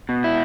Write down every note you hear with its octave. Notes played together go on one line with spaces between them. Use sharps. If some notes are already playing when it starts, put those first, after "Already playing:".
B2
E4